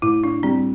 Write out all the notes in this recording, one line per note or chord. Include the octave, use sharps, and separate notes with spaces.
A2 E4
D4
G3 C4